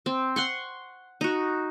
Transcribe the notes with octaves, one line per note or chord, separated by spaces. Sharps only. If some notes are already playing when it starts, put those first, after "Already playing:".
C4
F#5 C6 C#6
D#4 F#4